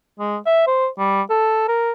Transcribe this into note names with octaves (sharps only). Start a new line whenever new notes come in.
G#3
E5
C5
G3
A4
A#4